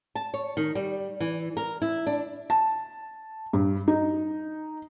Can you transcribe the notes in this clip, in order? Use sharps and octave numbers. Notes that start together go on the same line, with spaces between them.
A5
C#5
D#3
G3
E3
A#4
E4
D4
A5
G2
D#4